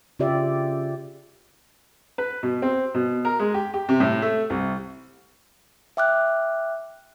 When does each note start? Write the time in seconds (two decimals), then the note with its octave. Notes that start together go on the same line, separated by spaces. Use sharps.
0.19 C#3 F4 G4 D5 E5
2.18 B4
2.43 B2
2.62 C4
2.94 B2
3.25 A#4
3.40 G#3
3.54 G4
3.74 G4
3.89 C3
4.00 A2
4.22 A3
4.50 C2
5.97 E5 G5 D6 F6 F#6